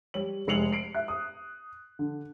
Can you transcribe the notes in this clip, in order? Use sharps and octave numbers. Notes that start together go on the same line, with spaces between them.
G3 C#5 F#7
F1 G#3 C7 C#7 F7 F#7
C7 D7
E5 F#6
D#6
D3